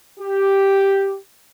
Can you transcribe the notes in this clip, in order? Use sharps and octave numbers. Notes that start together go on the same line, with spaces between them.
G4